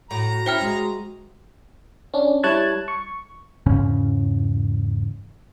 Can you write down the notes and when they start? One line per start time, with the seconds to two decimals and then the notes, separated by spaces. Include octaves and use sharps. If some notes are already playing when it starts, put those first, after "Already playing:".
0.11 A2 F#4 A#5
0.46 C#4 E4 C5 G5 F6
0.61 G#3 F#4
2.14 C#4 D4
2.43 G3 E4 C#5 A5 F#6 G#6
2.88 C#6
3.66 E2 G#2 C#3 C#4